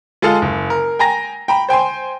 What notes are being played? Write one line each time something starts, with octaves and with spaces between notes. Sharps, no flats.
G#3 F4 G#4 A4 F5
F#1
A#4
G5 G#5 A#5 A#6
G5 A#5 B5
C5 G5 G#5 C6